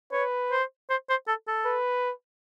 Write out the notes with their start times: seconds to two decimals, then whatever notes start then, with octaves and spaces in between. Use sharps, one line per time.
0.12 B4 C#5
0.51 C5
0.90 C5
1.09 C5
1.28 A4
1.48 A4
1.66 B4